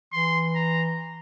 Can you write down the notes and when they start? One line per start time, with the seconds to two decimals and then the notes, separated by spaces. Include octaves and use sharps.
0.13 E3 C6
0.55 A#5